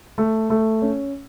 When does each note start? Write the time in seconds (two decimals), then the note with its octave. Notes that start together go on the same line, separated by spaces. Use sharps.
0.18 A3
0.50 A3
0.82 C#4